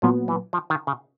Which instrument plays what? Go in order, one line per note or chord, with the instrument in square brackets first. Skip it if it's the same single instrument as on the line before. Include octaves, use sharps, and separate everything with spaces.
[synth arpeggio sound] A#2 F#3 B3 [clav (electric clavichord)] F3
[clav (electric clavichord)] E3
F3
D#3
C#3